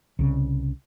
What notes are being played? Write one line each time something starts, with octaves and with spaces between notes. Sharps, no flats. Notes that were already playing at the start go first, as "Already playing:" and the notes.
C2 C#3